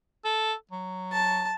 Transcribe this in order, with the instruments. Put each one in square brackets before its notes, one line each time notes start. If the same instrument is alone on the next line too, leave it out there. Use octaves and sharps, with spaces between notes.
[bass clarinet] A4
F#3
[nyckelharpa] A5